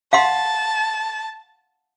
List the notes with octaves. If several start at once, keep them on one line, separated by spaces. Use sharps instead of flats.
F5 F#5 A5 C6